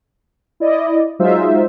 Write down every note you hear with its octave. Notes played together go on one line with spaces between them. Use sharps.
E4 D5 D#5
F#3 G#3 D#4 F4 C5 E5